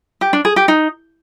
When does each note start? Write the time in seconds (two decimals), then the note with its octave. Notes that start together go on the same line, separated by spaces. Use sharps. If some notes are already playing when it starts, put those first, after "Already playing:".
0.21 G4
0.33 D4
0.45 G#4
0.56 G4
0.68 D#4